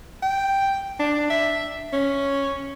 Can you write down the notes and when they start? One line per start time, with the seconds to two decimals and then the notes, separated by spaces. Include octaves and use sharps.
0.23 G5
1.00 D4
1.30 E5
1.93 C#4